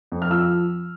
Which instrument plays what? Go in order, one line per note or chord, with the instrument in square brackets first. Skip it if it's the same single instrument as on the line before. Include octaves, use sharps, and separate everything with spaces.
[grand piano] F2
F6
F3 E6